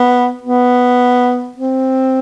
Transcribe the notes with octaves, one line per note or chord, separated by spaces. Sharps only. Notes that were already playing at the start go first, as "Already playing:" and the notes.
Already playing: B3
B3
C4